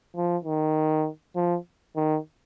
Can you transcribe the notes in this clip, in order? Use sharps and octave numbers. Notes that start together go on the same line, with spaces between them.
F3
D#3
F3
D#3